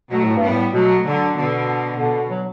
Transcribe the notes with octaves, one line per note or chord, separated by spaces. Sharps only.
B2 F#3 A3
A2
G2
G3 B3
A2
B2 F#3 A3
D3 F#3
B2 D3
B2 D3
F#3